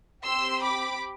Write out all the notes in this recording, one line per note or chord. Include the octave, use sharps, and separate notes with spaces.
C4 G4 C6 E6
B5 D6